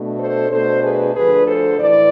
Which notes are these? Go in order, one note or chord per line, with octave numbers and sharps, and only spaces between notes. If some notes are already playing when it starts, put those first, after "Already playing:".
Already playing: B2 A3 D4
A4 C5
B2 A3 D4 A4 C5
G#4 B4
D2 D3 F3 G#4 B4
A4 C5
A2 E3 B4 D5